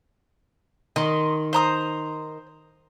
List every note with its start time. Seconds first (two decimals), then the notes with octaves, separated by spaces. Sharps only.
0.96 D#3 D#5 C6
1.53 C5 A#5 D#6